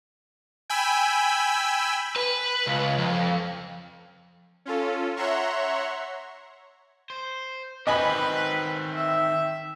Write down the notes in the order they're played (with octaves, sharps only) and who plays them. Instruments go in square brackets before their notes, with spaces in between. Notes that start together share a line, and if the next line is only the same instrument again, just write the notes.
[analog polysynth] G5 G#5 B5 E6
[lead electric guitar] B4
C#2
F2
[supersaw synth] C#4 F4 A4
C#5 E5 F#5 A#5 C6 C#6
[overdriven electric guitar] C5
[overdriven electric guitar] D#3 C4 [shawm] B4 [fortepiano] D#5 G#5 B5
[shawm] E5